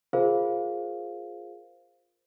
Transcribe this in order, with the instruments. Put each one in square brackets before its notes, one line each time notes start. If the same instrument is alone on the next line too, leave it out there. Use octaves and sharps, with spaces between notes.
[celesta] F4 G#4 A#4 C5 F5